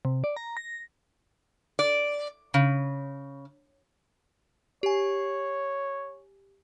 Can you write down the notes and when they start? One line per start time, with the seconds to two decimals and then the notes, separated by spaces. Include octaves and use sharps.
0.05 C3
0.24 D5
0.36 A#5
0.57 A#6
1.79 D5
2.54 C#3
4.83 G4 C#5 G#5